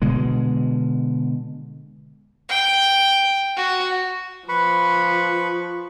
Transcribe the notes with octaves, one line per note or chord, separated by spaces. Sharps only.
B2 D3 G#3
G5
F#4
F3 B4 B5 C#6